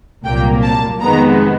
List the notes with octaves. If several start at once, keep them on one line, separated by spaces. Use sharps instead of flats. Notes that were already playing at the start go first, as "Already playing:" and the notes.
C2 A#2 F#3 A#3 G5
A5
F2 C3 D#3 G#3 B3 A#5